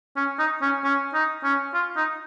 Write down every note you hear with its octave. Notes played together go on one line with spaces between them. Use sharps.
C#4
D#4
C#4
C#4
D#4
C#4
F4
D#4